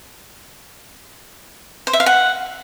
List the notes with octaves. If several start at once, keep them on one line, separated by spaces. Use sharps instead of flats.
C5
E5
F5
F#5